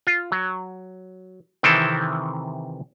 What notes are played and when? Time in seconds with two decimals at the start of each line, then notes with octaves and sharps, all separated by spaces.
0.07 F4
0.32 F#3
1.63 C3 D#3 E3 C4 E4 A4